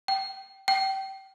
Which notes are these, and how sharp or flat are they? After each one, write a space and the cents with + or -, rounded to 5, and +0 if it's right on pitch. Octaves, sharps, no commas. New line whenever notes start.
G5 -20
G5 -25